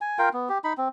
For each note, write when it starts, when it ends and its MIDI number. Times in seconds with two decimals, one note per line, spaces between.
0.01 0.18 80
0.19 0.29 65
0.19 0.29 70
0.19 0.29 77
0.19 0.29 79
0.33 0.49 59
0.49 0.58 67
0.64 0.73 63
0.64 0.73 83
0.77 0.88 60